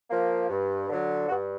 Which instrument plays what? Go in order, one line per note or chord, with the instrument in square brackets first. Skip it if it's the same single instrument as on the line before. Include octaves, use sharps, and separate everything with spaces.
[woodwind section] F3 A#3
G2
D3 F#3
G2 F#4